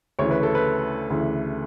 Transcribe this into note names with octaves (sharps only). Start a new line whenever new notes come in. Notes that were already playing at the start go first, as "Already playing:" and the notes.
D2 C#3 E3 C#5
B4
A4
B4
D2 C#3 E3